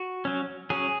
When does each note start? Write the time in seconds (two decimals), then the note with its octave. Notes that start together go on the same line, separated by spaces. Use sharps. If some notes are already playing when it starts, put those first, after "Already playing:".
Already playing: F#4
0.25 F#3 C#4
0.70 F#3 C#4 G#4